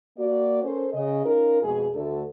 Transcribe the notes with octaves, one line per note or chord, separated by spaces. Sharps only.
A#3 F#4 D5
C#4 A4 A#4 C5
C#3 D#5
C#4 D#4 F4 A#4
F2 B2 G#3 G#4
D2 A4